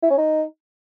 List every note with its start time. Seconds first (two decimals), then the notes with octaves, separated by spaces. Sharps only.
0.03 E4
0.10 C#4
0.18 D#4